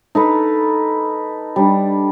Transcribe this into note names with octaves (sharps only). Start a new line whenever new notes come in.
D#4 A4 B4
G3 D4